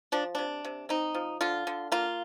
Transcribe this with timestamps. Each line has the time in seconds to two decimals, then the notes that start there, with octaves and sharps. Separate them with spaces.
0.12 F3 D4
0.35 C3 D4
0.65 C3
0.89 C4 D#4
1.15 F3
1.41 D3 F4
1.67 D3
1.92 A#3 F4